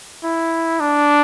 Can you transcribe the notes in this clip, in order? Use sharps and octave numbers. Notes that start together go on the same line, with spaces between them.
E4
D4